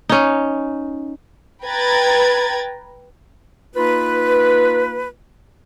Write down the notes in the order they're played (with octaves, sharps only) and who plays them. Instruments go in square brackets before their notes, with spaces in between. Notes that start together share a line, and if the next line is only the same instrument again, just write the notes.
[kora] C#4 D#4
[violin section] B4 G5 A#5 G#6 A6
[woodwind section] A#3 D#4 F4 B4